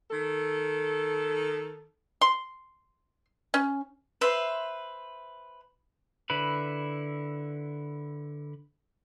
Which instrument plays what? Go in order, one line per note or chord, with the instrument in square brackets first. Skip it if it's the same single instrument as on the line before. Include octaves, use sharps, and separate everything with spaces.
[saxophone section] D#3 A4
[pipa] C6
C#4
[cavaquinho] B4 C5 E5 C6
[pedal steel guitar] D3 E4 B4 B5